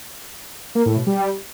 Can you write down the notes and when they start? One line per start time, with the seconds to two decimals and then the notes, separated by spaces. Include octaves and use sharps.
0.75 A#3
0.86 A2
0.96 B2
1.06 G3